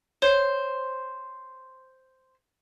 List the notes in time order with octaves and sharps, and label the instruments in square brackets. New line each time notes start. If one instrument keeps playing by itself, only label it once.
[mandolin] C5 [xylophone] C#5